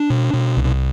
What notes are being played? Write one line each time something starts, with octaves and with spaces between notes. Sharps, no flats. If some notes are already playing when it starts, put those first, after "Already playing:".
Already playing: D4
B2
B2
C2